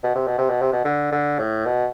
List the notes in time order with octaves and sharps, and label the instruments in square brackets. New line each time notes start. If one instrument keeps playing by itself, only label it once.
[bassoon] B2
C3
B2
C3
B2
C3
B2
D3
D3
A2
B2